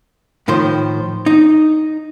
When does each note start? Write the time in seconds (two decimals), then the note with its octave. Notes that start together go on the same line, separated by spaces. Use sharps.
0.48 A2 D#3 F3 C5
1.26 D#4